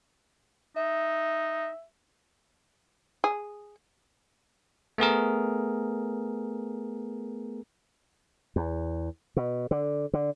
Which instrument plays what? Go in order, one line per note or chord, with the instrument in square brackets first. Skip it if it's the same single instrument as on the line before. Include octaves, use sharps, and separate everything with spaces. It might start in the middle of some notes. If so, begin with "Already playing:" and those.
[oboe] D#4 [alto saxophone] E5
[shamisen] G#4
[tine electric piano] A3 B3 G#4 A#4
[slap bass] E2
B2
D3
D3